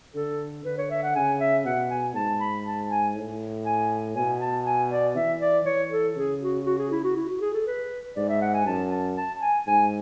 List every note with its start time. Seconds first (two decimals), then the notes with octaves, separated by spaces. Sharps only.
0.15 D3 A4
0.65 D3 B4
0.78 C#5
0.90 E5
1.03 F#5
1.15 C#3 G#5
1.40 E5
1.65 B2 F#5
1.90 G#5
2.15 G#2 A5
2.40 B5
2.66 A5
2.90 G#5
3.15 A2
3.66 G#5
4.16 B2 G#5
4.40 A5
4.66 G#5
4.90 D5
5.16 E3 E5
5.41 D5
5.65 E3 C#5
5.91 A4
6.16 C#3 G#4
6.41 F#4
6.66 F#4
6.79 G#4
6.91 E4
7.04 F#4
7.17 E4
7.29 F#4
7.41 G#4
7.54 A4
7.67 B4
8.16 G#2 D5
8.29 E5
8.41 F#5
8.54 G#5
8.66 F#2 A5
8.91 A5
9.17 A5
9.41 G#5
9.67 G#2 G#5